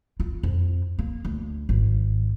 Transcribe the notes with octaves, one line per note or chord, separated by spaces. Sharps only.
F4
F2
A#3
D2
G#1